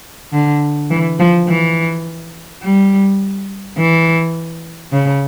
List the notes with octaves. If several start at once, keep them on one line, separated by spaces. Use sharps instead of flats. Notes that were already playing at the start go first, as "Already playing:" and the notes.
D3
E3
F3
E3
G3
E3
C#3